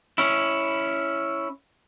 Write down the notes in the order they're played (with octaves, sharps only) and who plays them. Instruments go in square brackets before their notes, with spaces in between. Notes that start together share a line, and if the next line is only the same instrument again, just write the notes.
[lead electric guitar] C#4 E4